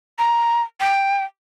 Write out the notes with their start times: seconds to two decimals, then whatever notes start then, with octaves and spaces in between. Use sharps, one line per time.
0.19 A#5
0.80 G5